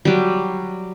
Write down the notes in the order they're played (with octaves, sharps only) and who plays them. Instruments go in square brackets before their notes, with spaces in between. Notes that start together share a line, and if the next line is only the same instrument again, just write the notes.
[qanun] F#3 G3